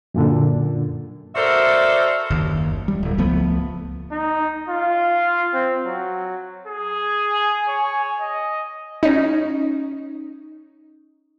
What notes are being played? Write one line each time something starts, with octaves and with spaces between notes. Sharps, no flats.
F#2 A#2 D3
F#4 A4 A#4 C5 D5 E5
F#1 D#2
G3
D1
C#2 F3 A3 B3
D#4
F4
C4
F#3
G#4
G#5
C#5
D#5
C#4 D#4